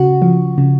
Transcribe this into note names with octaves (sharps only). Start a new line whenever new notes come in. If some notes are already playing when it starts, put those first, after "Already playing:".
Already playing: C#3 F#4
F3
C#3